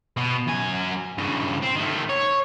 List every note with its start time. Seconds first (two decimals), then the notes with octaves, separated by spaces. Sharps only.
0.17 B2
0.48 F#2 G#5
1.18 G2 C#3
1.62 C4
1.76 D#3 A3
2.09 C#5